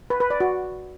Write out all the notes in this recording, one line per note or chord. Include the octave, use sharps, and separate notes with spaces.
B4
B4
D5
F#4